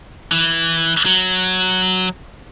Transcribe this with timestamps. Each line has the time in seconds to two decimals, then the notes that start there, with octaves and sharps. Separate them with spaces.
0.32 E3
1.05 F#3